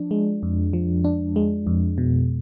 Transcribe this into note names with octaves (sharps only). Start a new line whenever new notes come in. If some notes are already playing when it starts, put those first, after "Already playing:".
Already playing: F3 D4
G#3
F2
F3
D4
G#3
F2
B2